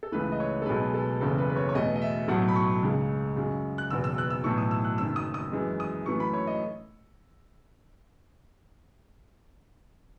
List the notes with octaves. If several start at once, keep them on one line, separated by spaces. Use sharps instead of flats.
A4
C#2 C#3 E3 A3 B4
D#5
C#5
A4
B1 B2 G#3 B4
A4
F#1 E2 C#3 A4
B4
B4
C#5
C#5
E2 B2 A3 D#5
D#5
E5
B1 A2 F#3 A3 F#5
B5
C#6
C#2 C#3 G#3
F#2 C#3 G#3
F#6
F#1 E2 B2 E6
E6
F#6
E6
B1 A2 E3 C#6
D#6
E6
F#6
F#1 F#2 D#3 E6
D#6
D#6
F#2 E3 G#3
D#6
F#2 E3 A3 C#6
B5
C#5
D#5